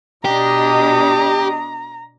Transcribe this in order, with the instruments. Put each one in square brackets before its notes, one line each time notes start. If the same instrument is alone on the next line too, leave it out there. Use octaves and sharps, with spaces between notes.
[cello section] B2 D4 D#5 [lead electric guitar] G4 [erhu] A#5